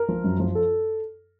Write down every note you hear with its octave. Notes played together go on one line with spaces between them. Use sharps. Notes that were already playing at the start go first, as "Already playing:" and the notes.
Already playing: A#4
F3
F#2
F3
A4